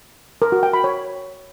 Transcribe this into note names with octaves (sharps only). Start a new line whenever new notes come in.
A#4
F#4
G5
B5
C#5